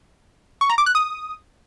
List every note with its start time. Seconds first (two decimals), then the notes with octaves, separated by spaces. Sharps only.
0.61 C#6
0.70 A#5
0.78 D6
0.86 F#6
0.95 D#6